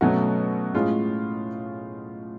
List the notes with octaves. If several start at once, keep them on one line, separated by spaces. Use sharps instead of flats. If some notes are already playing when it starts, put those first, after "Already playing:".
B2 F#3 A3 C#4 F#4
A2 G#3 C#4 F4